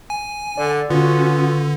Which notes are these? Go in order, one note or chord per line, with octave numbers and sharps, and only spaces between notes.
G#5
D3 D5
D3 B3 C#4 F4 F#4